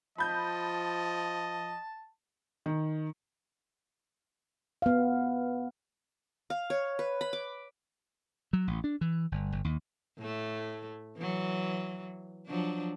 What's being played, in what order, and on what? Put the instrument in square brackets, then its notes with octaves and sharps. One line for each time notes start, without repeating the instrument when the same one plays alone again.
[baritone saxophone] F3 [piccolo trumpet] D#5 [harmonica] A5 [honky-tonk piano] B5 G6
[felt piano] D#3
[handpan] B3 F5
[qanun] F5
C#5
B4
B5
D6
[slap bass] F#3
A1
D4
E3
G1
G1
D#2
[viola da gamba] A2 A3
E3 F#3
F3 F#3 D4